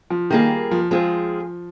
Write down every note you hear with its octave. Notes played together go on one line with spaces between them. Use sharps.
F3
D#3 G3 A#3 F4 G#4
F3
F3 G#3 C4 F4 G#4